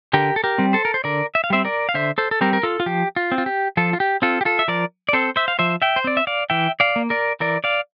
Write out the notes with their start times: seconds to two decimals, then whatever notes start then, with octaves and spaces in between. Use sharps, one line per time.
0.13 D3 G4 A#4
0.36 A4
0.44 G4 A#4
0.58 G3 C4
0.73 A4 C5
0.85 A#4
0.94 C5
1.04 D3 A#4 D5
1.35 E5
1.44 F5
1.50 G3 C4 C5 E5
1.65 A#4 D5
1.89 F5
1.94 D3 C5 E5
2.18 A4 C5
2.31 A4
2.41 G3 C4 G4 A#4
2.53 A#4
2.63 F4 A4
2.80 F4
2.86 F3 G4
3.16 F4
3.32 C4
3.38 F4
3.46 G4
3.77 F3 F4 A4
3.93 F4
4.00 G4
4.22 C4 F4 A4
4.41 G4
4.45 F4 A4
4.59 E5
4.68 F3 A#4 D5
5.09 D5
5.13 C4 A4 C5
5.36 C5 E5
5.48 F5
5.59 F3 C5 E5
5.82 E5 G5
5.96 C5
6.04 C4 D5
6.17 E5
6.27 D5 F5
6.50 E3 E5 G5
6.80 D5 F5
6.96 A#3
7.10 A#4 D5
7.40 E3 A#4 D5
7.64 D5 F5